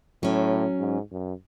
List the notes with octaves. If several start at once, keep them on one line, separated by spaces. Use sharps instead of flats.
A2 F#3 C#4
G#2
F#2